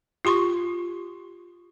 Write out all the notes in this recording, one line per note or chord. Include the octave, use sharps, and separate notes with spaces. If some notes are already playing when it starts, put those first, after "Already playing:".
F4 G4 C6 C#6